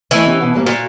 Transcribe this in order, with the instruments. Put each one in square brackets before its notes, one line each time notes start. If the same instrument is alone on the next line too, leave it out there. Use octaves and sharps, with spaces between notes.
[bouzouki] E3 [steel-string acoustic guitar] A3 D#5 G#5
[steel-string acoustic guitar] C#4 G4
B2 F#5
G#2 G3 A#3
[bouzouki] A#2 [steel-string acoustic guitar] F#4